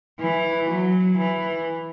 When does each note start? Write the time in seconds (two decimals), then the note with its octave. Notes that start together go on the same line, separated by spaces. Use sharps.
0.20 E3
0.70 F#3
1.18 E3